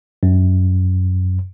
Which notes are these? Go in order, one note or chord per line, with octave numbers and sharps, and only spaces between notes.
F#2